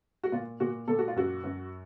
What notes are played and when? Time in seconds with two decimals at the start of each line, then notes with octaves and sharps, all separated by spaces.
0.24 F#4
0.32 A#2 F4
0.60 A#2 F#4
0.88 A#2 A4
0.99 F#4
1.08 F4
1.16 F#2 F#4
1.43 F#2